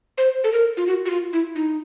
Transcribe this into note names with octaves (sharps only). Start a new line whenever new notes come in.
C5
A4
A#4
F4
F#4
F#4
F4
E4
D#4